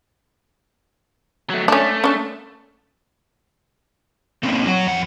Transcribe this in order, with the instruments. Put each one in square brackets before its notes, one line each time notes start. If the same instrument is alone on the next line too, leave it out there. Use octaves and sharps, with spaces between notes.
[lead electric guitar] F#3 A3
[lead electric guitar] A3 [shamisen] C#4 D4
[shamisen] C#4 D4
[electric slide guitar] A3 A#3 C4 C#4 D#4
F#3 F#4
F2 F#5